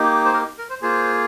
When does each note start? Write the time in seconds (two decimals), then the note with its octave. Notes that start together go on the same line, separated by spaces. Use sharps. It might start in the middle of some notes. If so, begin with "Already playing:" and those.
Already playing: A#3 D#4 G4
0.25 C5
0.34 A#4
0.58 A#4
0.70 C5
0.82 A#3 F4 G#4 C5